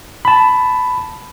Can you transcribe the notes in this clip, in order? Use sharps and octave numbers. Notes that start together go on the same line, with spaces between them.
A5 B5